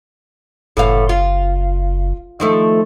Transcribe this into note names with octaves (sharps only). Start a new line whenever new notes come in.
F#1 A2 E3 F5
F4
D#3 F3 A3